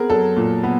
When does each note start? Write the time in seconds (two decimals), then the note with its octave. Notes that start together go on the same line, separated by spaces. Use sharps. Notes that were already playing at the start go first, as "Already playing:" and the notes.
Already playing: B3 C4 G#4 A#4
0.10 F#3 A4
0.36 A#2
0.63 B3